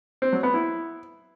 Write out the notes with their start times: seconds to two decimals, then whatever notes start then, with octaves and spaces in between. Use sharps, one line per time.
0.22 C4
0.33 F#3
0.43 B3
0.54 E4